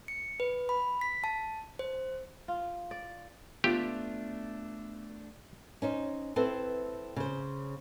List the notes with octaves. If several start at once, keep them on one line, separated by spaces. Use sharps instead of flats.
C#7
B4
B5
B6
A5
C5
F4
D5
A3 B3 D4 F4 G4
C#4 D#4 C5
C4 E4 A4 B4 C5
C#3 C5